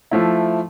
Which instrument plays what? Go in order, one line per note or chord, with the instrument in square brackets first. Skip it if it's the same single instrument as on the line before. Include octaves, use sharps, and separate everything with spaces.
[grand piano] F3 A3 E4